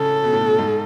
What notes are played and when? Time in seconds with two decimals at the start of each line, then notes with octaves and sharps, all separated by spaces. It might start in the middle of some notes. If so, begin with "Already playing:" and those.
Already playing: A2 C#3 A4
0.24 B2
0.33 A2
0.41 B2
0.58 G#2